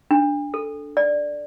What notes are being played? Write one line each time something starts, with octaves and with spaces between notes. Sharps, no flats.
D4
A4
D5